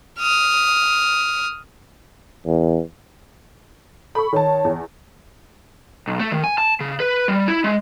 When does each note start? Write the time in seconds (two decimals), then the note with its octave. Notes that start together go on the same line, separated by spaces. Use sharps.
0.19 D#6 F6
2.46 E2
4.15 A4 B5 C#6
4.33 D#3 C#5 A5
4.64 E2
6.07 B1
6.20 A3
6.32 D#3
6.44 G#5
6.58 A5
6.80 C#3
7.00 B4
7.28 G3
7.48 E4
7.64 G#3